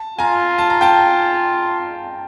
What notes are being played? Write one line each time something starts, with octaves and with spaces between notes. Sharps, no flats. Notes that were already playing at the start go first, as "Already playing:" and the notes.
Already playing: A5
F4 G#5 A#5
A5
A#5
G5 A5